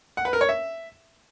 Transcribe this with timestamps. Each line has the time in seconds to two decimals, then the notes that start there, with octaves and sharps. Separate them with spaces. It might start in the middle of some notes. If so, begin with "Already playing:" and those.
0.17 F#5
0.25 B4
0.33 A#4
0.41 C#5
0.49 E5